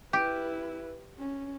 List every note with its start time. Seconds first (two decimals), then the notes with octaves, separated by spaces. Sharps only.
0.13 E4 G4 B4
1.19 C#4